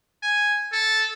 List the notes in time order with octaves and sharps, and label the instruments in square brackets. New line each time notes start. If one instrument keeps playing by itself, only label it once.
[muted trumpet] G#5
A4